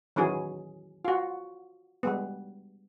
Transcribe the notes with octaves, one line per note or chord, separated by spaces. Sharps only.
D#3 E3 F#3 C#4 G#4
F4 F#4
G3 G#3 B3